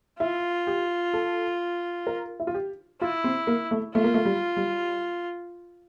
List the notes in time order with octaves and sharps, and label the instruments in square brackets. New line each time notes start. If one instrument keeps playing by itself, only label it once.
[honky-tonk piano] E4 [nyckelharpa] F4
[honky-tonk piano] G4
A4
A#4
E4
F4
G4
[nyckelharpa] E4 [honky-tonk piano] F4
[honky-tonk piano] C4
A#3
A3
[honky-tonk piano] A3 [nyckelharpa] F4
[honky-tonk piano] A#3
A3
G3
G3